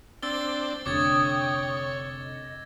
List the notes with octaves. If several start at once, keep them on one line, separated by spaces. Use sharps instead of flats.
C4 D4 E6 A6 G7
F1 D3 C#5 G5 D6 D#6 G#6 A6
D#5